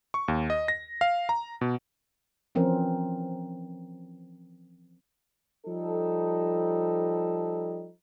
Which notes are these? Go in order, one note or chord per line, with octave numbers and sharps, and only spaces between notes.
C#6
D#2
D#5
A#6
F5
A#5
B2
E3 F3 C4 C#4 A#4
F3 G3 D#4 A4